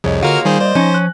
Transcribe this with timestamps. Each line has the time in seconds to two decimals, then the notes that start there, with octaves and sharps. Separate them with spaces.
0.04 C2 F2 G#4 C#5 D#5
0.23 D3 A#3 F4 F#4 A#4 F6
0.45 D#3 G3 G#4 C5
0.61 C5 D5 D#5
0.75 F3 C#4 D#4 A#6
0.90 G#5 F#6